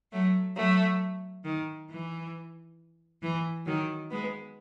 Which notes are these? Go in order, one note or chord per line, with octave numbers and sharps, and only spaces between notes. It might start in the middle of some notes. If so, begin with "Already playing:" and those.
F#3 A3
F#3 A3
D#3
E3
E3
D#3 F#3
G#3 B3